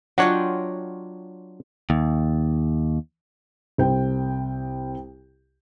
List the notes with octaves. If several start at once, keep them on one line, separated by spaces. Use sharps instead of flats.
F#3 D4 F4 C#5 D#5 F#5 G5
D#2
C2 C5 G5